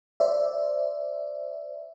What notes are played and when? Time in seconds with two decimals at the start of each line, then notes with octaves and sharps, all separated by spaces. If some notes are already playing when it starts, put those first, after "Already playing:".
0.20 C5 D5 E5